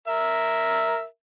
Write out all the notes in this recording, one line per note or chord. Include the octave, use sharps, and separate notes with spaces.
A#4 E5